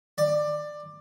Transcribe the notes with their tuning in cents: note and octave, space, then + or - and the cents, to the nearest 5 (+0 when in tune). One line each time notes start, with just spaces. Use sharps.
D5 +15